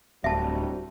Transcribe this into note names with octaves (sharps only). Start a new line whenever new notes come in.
D1 G3 C4 F#4 E5 A5